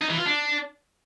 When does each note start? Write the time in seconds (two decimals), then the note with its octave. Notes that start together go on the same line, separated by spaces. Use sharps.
0.01 D#4
0.10 E3
0.18 F4
0.26 D4